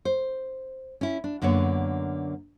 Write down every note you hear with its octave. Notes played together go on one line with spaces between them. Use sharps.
C5
C#4 E4
D4
F#2 D3 A#3 B3 C#5